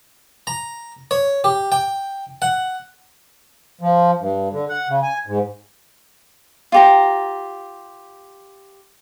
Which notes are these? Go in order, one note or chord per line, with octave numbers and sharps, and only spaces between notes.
A#5
C#5
G4
G5
F#5
F3
G2
D3
F#5
C#3
G#5
G#2
F4 G4 A#5